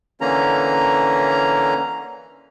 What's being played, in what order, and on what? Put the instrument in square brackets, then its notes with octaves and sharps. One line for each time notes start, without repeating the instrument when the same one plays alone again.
[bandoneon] D3 E3 A#3 C#4 A#5